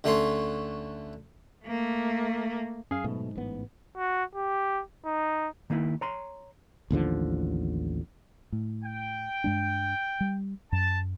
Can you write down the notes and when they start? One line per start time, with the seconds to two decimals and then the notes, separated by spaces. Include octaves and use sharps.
0.04 D2 D3 A3 C#4 C#5 C6
1.65 A3 A#3
2.91 F#2 G#4 F5
3.04 G#2 B2 A3
3.36 A1 B3
3.97 F#4
4.35 G4
5.06 D#4
5.70 D#3 A#3 D#4 E4
6.01 C#5 A#5 C6
6.91 A1 D#2 D3 F3
8.52 A2
8.84 G5
9.44 G2 G#3 D4
10.21 G3
10.72 F#2 A5